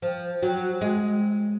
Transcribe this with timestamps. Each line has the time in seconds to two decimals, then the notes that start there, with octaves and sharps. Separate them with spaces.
0.02 F3
0.43 F#3
0.81 G#3